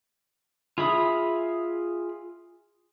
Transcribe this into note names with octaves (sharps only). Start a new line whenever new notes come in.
F4 G#4 E5 B5 D#6